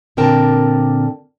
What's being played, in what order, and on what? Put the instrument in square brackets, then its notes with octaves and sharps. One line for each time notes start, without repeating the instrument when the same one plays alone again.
[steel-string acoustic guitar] A#2 D3 C4 A#4 G5 A5